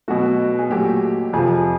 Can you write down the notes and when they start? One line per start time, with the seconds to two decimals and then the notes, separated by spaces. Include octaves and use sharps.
0.08 B2 F#3 A3 F#4
0.59 G#4
0.70 A#2 F#3 A3 G4
1.33 F2 C3 F3 G#4